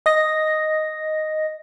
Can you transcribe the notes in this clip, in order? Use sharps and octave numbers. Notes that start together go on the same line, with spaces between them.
D#5 A#6